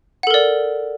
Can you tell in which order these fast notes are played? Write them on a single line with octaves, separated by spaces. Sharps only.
F#5 A4 A#4 D5